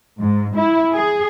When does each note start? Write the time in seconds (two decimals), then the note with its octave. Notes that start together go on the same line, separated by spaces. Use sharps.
0.19 G#2
0.56 E4
0.93 G#4